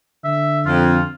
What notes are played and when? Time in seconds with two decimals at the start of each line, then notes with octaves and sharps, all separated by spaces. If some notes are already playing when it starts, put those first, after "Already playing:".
0.24 D3 E5
0.66 F2 F4